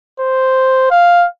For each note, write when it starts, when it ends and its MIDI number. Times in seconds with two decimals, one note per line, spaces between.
0.20 0.89 72
0.91 1.26 77